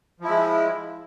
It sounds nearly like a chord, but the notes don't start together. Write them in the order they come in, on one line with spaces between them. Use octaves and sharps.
F3 E4 G#3